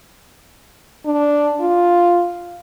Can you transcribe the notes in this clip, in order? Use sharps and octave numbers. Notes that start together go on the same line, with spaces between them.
D4
F4